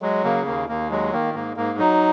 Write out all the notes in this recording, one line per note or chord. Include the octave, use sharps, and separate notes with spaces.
F#3 G#3
C#3 A#3
D#2 A#3
D#2 A#3
F#3 G#3
D#3 A#3
G#2 A#3
G#2 A#3
F#3 D#4